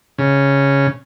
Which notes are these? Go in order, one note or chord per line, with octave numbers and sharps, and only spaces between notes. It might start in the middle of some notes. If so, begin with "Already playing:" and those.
C#3